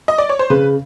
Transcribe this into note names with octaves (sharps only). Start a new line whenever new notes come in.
D#5
D5
C#5
C5
C#3 B4